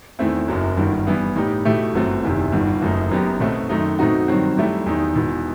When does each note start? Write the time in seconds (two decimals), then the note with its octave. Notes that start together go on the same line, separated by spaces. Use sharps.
0.19 E2 D#3 A3 C4 E4
0.48 F#1 F#2 F#3
0.77 G1 G2 D#3
1.07 G2 E3 B3 E4
1.36 A2 G3 D#4 G4
1.65 B2 A3 E4 G4
1.94 G1 F#2 F#3 A3 C4
2.23 F#1 E2 C3 D#3
2.52 G1 G2 D#3
2.82 F#1 F#2 F#3 A3 D#4
3.11 F#2 F#3 B3 D#4 G4
3.40 B1 B2 F#3 A3 C4
3.70 F#2 D#3 F#3 A3 D#4
3.99 B2 A3 C4 D#4 F#4
4.28 G2 D#3 F#3 C4
4.57 G2 F#3 A3 E4 G4
4.86 E2 D#3 G3 D#4
5.15 E1 E2 B2